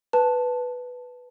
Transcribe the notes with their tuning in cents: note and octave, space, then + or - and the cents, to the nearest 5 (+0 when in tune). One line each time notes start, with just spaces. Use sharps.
B4 +0 A5 +0